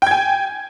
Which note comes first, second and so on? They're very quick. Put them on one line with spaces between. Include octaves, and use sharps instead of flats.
G5 G#6 G#5